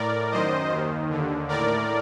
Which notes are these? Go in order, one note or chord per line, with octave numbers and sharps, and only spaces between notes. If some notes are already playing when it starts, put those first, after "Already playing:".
Already playing: A2 A#4 D5
F#2 D#3 C5 D#5
D#2 D#3
D#2 D3
A2 A#4 D5